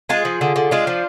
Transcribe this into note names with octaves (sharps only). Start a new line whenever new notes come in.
G#3 F4 G#4
F3
D3
D3
G#3 D4 F4
F3